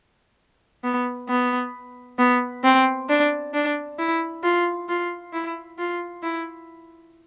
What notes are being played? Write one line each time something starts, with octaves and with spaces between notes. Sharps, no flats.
B3
B3
B3
C4
D4
D4
E4
F4
F4
E4
F4
E4